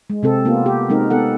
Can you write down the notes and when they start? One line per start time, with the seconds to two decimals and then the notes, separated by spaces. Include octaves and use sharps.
0.10 G#3
0.23 C3 C4 A4
0.45 A#3 B3 F4
0.66 G4
0.89 G#3 C4 D#4 A#4
1.10 B3 A4 F#5